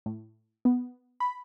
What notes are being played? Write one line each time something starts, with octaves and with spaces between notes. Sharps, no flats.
A2
B3
B5